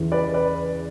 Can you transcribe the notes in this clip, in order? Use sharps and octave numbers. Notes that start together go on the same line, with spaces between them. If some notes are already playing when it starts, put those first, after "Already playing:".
Already playing: E2 C#3 E3
B4 D5
B4 D5